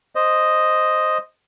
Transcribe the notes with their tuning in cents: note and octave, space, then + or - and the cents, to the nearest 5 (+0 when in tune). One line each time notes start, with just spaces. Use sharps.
C5 +0 D#5 +0